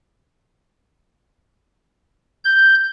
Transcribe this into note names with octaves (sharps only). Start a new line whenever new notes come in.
G6